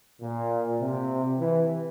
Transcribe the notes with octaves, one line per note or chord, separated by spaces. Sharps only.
A#2
C3
E3